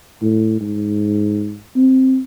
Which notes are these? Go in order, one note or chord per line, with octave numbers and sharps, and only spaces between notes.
A2
G#2
C4